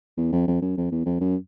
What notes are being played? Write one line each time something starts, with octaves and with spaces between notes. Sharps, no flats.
E2
F2
F2
F#2
F2
E2
F2
F#2